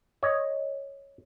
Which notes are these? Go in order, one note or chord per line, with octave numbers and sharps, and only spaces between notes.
C#5 D#5